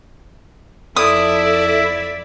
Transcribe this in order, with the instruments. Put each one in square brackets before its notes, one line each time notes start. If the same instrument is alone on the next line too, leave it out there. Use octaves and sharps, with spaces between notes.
[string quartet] F2 D5 E5 [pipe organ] E4 [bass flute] A4 [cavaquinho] D#6